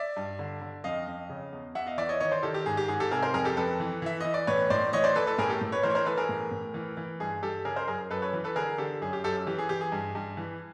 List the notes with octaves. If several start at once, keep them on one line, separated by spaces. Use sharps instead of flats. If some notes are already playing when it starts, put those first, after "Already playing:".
Already playing: D5 E5
G2
D3
D3
F2 D#5 F5
F2
C#3
E2
E2 E5 F#5
D#5 F5
E3 D5 E5
C#5 D#5
D#3 C#5 D#5
C5 D5
D#3 G4 A4
G4
G#2 G#4
G4
G#2 G#4
G4 A4
C3 G#4 A#4
A#4 C5
F2 G#4 A#4
G4 A4
F2 A4 B4
E3
E3 E5
E3 D#5
D5
A2 B4 C#5
A2 C5 D5
E3 C#5 D#5
C5 D5
E3 A4 B4
A4 B4
A2 G#4 A#4
G4 A4
A2
B4 C#5
E3 A#4 C5
C#5
A#4 C5
E3 A4 B4
G#4 A#4
A2
A2
E3
E3
G2 G#4
G2 G4 A4
C#3 G#4 A#4
A#4 C5
F#2 G#4 A#4
F#2 A4 B4
B4 C#5
E3
A4 B4
D3 G#4 A#4
D3 G4 A4
F#2 G#4
G4
F#2 G4 A4
E3 G4
G#4
E3 G4
G#4
G2
G2
E3